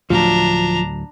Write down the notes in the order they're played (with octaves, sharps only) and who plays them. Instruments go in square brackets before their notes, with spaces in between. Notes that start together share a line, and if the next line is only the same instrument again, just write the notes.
[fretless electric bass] D2 A2 F#3 [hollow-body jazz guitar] F3 [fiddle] D4 A#5